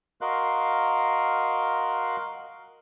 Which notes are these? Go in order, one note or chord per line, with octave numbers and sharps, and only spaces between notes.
F#4 A#4 D#5 F5 C6 F#6